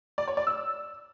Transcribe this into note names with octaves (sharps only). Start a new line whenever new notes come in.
D5
C#5
D5
E6